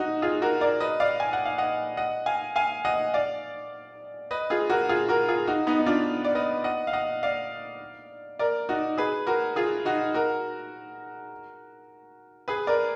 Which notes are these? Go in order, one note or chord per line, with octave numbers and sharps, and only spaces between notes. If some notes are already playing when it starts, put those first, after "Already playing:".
Already playing: D#4 F#4
F4 G#4
F#4 A#4
A#4 D5
B4 D#5
D5 F5
G#5
F#5
F5
D#5 F#5
D#5 F#5
F5 G#5
F5 G#5
D#5 F#5
D5 F5
B4 D#5
F4 G#4
F#4 A#4
F4 G#4
F#4 A#4
F4 G#4
D#4 F#4
B3 D#4
D#4
D4 F4
D5
B4 D#5
D#5 F#5
F5
D#5 F#5
D5 F5
A#4 D5
D#4 F#4
G#4 B4
F#4 A#4
F4 G#4
D#4 F#4
F#4 A#4
G#4 B4
A#4 D5